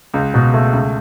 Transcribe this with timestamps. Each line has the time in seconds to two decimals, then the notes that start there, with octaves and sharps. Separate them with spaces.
0.14 C#2
0.34 B2
0.54 A3
0.73 C#2